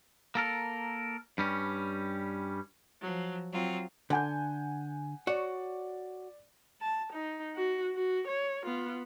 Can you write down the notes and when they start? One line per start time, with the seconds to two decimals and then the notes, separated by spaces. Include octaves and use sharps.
0.35 A#3 A4 A#4
1.38 G2 G3 C#4
3.01 F3 F#3
3.52 F#3 C4 F4
4.10 D3 F#5 G#5 G6
5.27 F#4 C#5 D5
6.81 A5
7.13 D#4
7.55 F#4
7.95 F#4
8.27 C#5
8.65 B3 F4